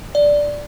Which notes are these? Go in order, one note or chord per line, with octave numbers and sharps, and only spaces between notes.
D5